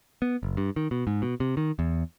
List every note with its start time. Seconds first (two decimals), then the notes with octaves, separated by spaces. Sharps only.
0.22 B3
0.43 F#1
0.57 G2
0.76 D#3
0.91 B2
1.07 G#2
1.22 B2
1.40 C3
1.57 D#3
1.79 E2